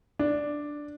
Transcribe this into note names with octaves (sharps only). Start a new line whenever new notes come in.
D4